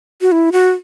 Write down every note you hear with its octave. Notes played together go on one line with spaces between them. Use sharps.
F#4
E4
F#4